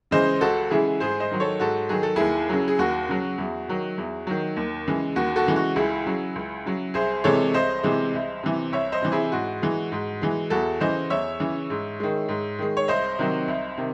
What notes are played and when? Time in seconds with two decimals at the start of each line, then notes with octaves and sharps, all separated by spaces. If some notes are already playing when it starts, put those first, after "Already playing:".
0.11 C#3 E3 G#3 C5 D#5
0.41 C#2 F#4 A4
0.71 C#3 E3 G#3 E4 G#4
1.00 G#2 G#4 C5
1.20 C5 D#5
1.31 D#3 F#3
1.40 A4 C#5
1.60 G#2 F#4 A4
1.89 D#3 F#3 G#4
2.03 A4
2.16 D#2 E4 G#4
2.49 C#3 F#3
2.68 G#4
2.79 D#2 F#4
3.08 C#3 F#3
3.38 E2
3.69 D#3 F#3
3.98 E2
4.27 D#3 F#3
4.56 D#2
4.87 C#3 E3 G#3
5.16 D#2 F#4
5.36 F#4 A4
5.46 C#3 E3 G#3
5.56 F#4
5.76 C#2 E4 G#4
6.06 C#3 F#3
6.35 C#2
6.65 C#3 F#3
6.94 C2 G#4 C5
7.24 C3 E3 G#3 A4 C#5
7.53 C2 C5 D#5
7.83 C3 E3 G#3
8.14 C2
8.43 C3 E3
8.72 C2 C#5 E5
8.92 C5 D#5
9.02 C3 E3
9.12 E4 G#4
9.32 G#2 F#4
9.62 E3 G#3
9.92 G#2
10.21 E3 G#3
10.50 E2 F#4 A4
10.80 C#3 E3 C5 D#5
11.10 E2 C#5 E5
11.40 C#3 E3
11.70 G#2
12.00 D#3 G#3
12.28 G#2
12.59 D#3 G#3
12.77 C#5
12.88 C2 C5 D#5
13.19 C3 D#3 F#3
13.48 C2
13.77 C3 D#3